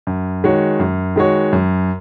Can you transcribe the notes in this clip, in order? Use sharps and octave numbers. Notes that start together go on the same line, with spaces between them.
F#2
D#3 G#3 F#4 C#5
F#2
D#3 G#3 F#4 C#5
F#2